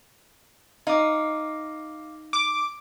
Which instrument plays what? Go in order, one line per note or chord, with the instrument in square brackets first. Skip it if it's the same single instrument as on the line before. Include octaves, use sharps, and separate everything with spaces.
[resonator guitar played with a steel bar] D#4 [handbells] F5 D6
[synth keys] D6